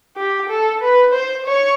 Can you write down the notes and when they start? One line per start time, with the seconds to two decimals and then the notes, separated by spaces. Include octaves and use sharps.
0.17 G4
0.49 A4
0.81 B4
1.13 C5
1.46 C#5